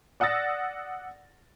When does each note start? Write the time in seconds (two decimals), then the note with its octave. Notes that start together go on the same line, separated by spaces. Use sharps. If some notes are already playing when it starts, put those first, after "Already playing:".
0.20 D5 F#5 D#6 E6 A6 A#6